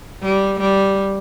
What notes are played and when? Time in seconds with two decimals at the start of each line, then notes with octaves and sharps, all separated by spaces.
0.22 G3
0.59 G3